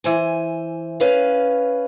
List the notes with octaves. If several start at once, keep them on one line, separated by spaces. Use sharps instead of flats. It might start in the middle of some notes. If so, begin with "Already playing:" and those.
E3 C5 G#5
C#4 B4 F5